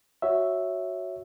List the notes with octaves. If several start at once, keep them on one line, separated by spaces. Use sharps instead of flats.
F#4 C#5 E5